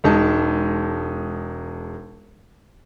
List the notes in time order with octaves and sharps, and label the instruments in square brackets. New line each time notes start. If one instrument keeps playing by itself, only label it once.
[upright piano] E1 G#3 D#4 A5